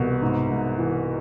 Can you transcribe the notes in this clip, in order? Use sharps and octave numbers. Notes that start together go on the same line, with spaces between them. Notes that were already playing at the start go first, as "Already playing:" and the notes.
Already playing: C2 B2
G#2
G#2
E3